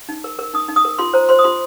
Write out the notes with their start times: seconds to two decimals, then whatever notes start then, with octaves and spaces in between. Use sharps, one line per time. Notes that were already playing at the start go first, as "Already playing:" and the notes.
0.09 D#4
0.24 A#4
0.39 A#4
0.54 D#4 D#6
0.69 D#4
0.76 D#6
0.85 A#4
0.99 F4 C6
1.14 C5 A#5
1.29 C5 C6
1.39 D#6
1.44 F4 C6